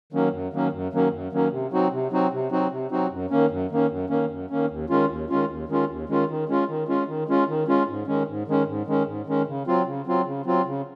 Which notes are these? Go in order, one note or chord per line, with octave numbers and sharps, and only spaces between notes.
D#3 F#3 A#3 C#4
F#2
D#3 F#3 A#3 C#4
F#2
D#3 F#3 A#3 C#4
F#2
D#3 F#3 A#3 C#4
C3
F#3 C4 D#4 F#4
C3
F#3 C4 D#4 F#4
C3
F#3 C4 D#4 F#4
C3
F#3 C4 D#4 F#4
F#2
D#3 A#3 C#4
F#2
D#3 A#3 C#4
F#2
D#3 A#3 C#4
F#2
D#3 A#3 C#4
D#2
D#3 G#3 C#4 F4
D#2
D#3 G#3 C#4 F4
D#2
D#3 G#3 C#4 F4
D#2
D#3 G#3 C#4 F4
D#3
G#3 C#4 F4
D#3
G#3 C#4 F4
D#3
G#3 C#4 F4
D#3
G#3 C#4 F4
G#2
D#3 G#3 C#4
G#2
D#3 G#3 C#4
G#2
D#3 G#3 C#4
G#2
D#3 G#3 C#4
C#3
F#3 C4 F4
C#3
F#3 C4 F4
C#3
F#3 C4 F4
C#3